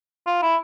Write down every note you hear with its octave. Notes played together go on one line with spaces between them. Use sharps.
F4
E4